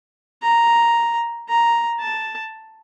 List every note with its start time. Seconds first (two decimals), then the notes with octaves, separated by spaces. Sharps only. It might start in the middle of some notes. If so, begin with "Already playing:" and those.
0.42 A#5
1.49 A#5
2.01 A5